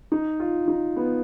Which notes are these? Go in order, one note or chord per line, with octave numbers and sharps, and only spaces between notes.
D#4
F4
D#4
B3